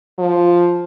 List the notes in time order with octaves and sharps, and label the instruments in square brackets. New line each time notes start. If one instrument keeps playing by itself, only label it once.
[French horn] F3